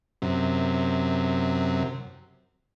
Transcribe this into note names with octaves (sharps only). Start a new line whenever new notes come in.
F#2 C3